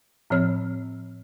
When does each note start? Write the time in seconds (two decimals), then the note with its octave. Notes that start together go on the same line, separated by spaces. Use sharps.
0.30 A2 F3 C4 C#5 E6 F6